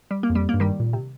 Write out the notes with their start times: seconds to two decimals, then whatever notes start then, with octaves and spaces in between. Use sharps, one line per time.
0.11 G3
0.23 A#3
0.30 F2
0.35 G3
0.49 G2 A#3
0.60 D#3 G3
0.80 A#2
0.93 C3